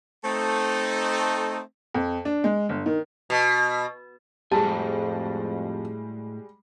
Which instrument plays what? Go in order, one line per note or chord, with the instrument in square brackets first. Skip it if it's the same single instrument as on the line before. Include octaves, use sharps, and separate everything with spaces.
[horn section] A3 C4 D#4
[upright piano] F2
D4
G#3
G1
D#3
[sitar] B2
[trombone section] F2 [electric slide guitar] A2 F#4 G#5 [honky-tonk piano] G3 G#3 [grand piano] A5